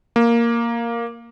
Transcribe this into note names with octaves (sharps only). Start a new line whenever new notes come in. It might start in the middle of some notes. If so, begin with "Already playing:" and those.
A#3